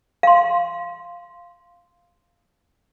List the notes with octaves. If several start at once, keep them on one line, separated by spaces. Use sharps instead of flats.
F5 C6